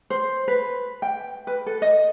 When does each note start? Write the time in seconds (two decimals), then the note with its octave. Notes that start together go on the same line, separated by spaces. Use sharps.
0.10 C5
0.48 B4
1.02 G5
1.47 B4
1.66 A4
1.82 D#5